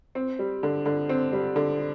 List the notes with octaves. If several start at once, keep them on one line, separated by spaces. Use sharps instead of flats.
C4
G3
D3
D3
C4
G3
D3